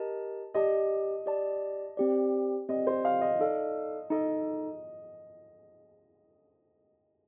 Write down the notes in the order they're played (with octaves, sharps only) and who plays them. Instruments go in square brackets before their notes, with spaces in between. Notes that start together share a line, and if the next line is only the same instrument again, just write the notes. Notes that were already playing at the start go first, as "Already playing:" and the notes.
Already playing: [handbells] G4 A#4 D#5 A5
[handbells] G4 D5 A5 [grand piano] D#5
[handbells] G4 D5 A5
C4 G4 D5
[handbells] C4 G4 D5 [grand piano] D#5
[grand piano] C5
F5
D#5
[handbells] D#4 A4 D5 F5
[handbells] D#4 A4 [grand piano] D#5